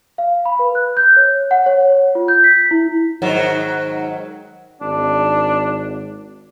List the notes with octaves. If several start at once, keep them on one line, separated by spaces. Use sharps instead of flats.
F5
B5
B4
F#6
G6
C#5
F#5
C#5
F4
G6
B6
E4
G#2 D#3 F#3
G#1 D4